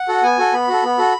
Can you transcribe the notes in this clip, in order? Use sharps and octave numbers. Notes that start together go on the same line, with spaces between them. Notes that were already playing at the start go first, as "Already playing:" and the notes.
Already playing: F#5
F#4 A4
B3 G#5
F#4 A4
B3 B5
F#4 A4
B3
F#4 A4